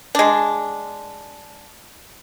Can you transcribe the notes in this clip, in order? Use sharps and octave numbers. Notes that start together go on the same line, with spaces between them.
G#3 D4